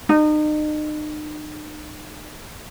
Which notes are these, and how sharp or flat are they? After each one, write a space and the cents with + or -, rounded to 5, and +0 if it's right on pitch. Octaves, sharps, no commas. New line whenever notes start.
D#4 -40